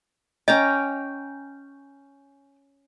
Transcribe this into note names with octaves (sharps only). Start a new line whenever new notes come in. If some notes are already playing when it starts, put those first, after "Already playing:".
C#4 D#5 G5 A#5 D6